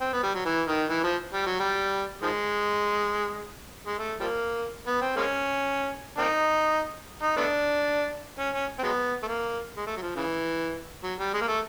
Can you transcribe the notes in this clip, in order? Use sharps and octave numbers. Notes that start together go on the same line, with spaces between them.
C4
B3
G3
F#3
E3
D#3
E3
F3
G3
F#3
G3
D#3 F3 G#3
G#3
A3
F3 G3 A#3
B3
C4
G#3 A#3 C#4
A#3 C4 D#4
D#4
A3 B3 D4
C#4
C#4
C4
F#3 G#3 B3
A3
A#3
G#3
A3
F#3
F3
C#3 E3
F#3
G3
G#3
A#3
A3